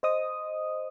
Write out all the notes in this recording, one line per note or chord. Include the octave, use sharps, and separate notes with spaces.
C5 D#5 D#6